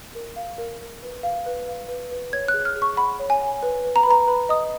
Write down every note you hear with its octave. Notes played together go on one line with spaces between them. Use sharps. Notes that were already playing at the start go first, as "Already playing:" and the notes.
A#4
F5
A#4
A#4
B4
F5
B4
F5
B4
B4
C#5 G#6
F#6
G#4
F6
G#4
C#6
F#5 B5
C#5
G#5
F#5
B4
B4
A#5
B5
B4 A#5
B4 B5
D#5 D#6